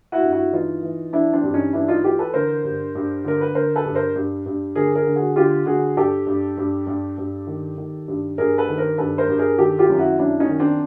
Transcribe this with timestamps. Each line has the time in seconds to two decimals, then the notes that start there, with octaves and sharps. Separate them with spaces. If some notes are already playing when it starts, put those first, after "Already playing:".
0.12 E4 F#4
0.23 G2
0.33 E4 F#4
0.53 E3 D#4 F4
0.83 E3
1.13 E3 D4 E4
1.33 C4 D4
1.43 G2
1.54 C#4 D#4
1.73 E3 D4 E4
1.88 D#4 F4
2.04 E3 F4 G4
2.19 A4 B4
2.34 D3 A#4 C5
2.64 G2
2.95 G2
3.24 D3 A#4
3.41 B4
3.54 D3 A#4 C5
3.76 A4 B4
3.85 G2
3.95 A#4 C5
4.16 G2
4.46 G2
4.76 D3 G#4 A#4
4.95 G#4 A#4
5.07 D3
5.16 F#4 G#4
5.36 D3 F4 G4
5.66 D3 F#4 G#4
5.97 G2 G4 A4
6.27 G2
6.57 G2
6.87 G2
7.18 G2
7.47 D#3
7.78 D#3
8.08 G2
8.38 G2 G#4 A#4
8.58 A4 B4
8.69 D#3
8.78 A#4 C5
8.98 G2 A4 B4
9.18 A#4 C5
9.28 G2
9.38 G#4 A#4
9.58 D#3 G4 A4
9.79 F4 G4
9.89 F#2
9.99 E4 F#4
10.19 F#2 D4 E4
10.40 C#4 D#4
10.49 D#3
10.59 C4 D4